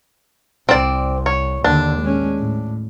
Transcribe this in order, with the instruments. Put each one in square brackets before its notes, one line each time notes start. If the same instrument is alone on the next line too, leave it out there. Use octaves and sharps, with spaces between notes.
[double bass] C2 [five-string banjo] C4 D5
[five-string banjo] C#5
[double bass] D#2 D3 [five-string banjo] D4
[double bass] G#3 C#4
A2